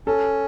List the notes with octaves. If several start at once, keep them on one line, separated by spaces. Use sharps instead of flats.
C#4 A4